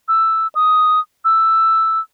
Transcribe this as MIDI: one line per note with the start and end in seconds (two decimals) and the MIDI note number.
0.08 0.47 88
0.55 1.00 87
1.25 2.00 88